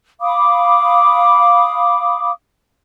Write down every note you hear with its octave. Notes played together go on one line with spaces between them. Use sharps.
F5 B5 D6 D#6